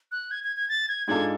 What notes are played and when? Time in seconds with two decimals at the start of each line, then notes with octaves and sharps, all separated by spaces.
0.12 F#6
0.31 G#6
0.44 G#6
0.57 G#6
0.69 A6
0.88 G#6
1.08 G#2 G#3 D4 F4 A4 G#6